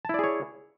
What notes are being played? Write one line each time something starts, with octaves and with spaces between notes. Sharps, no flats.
E4 G#4 C#5 D5 A5